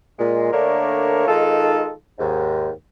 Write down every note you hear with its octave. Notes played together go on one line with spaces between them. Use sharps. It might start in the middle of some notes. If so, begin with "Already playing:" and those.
A#2 G#3
D3 A3 A#3 D4 A#4 C#5
D#3 G#3 D#4 F4 A4
D#2 G#2